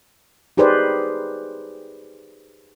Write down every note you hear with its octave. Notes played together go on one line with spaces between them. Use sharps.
D#4 G4 G#4 B4 C5 D5